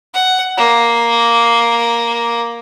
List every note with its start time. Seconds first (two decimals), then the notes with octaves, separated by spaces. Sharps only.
0.14 F#5
0.58 A#3